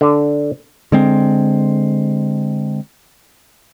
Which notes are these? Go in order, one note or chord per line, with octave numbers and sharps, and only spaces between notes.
D3 D5
D3 G#3 C4